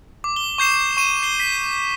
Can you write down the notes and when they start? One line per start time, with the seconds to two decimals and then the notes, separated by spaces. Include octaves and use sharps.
0.24 D6
0.36 G7
0.58 C#6 G6 C7 E7
0.97 C#6 D#7 E7
1.23 C7 G7
1.40 B6